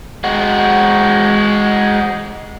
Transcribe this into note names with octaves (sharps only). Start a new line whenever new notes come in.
G#3 F#4